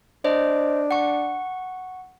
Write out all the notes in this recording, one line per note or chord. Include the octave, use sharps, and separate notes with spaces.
D4 C5 D#5
F#5 C#6